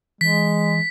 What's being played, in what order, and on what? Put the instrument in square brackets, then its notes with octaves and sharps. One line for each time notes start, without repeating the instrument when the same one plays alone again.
[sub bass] E3 [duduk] G#3 [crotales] B6